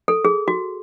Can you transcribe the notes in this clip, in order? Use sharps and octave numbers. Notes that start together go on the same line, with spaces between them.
A4
G#4
F#4